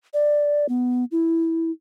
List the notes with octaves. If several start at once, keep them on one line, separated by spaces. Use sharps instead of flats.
D5
B3
E4